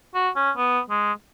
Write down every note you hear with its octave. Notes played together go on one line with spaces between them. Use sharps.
F#4
C#4
B3
G#3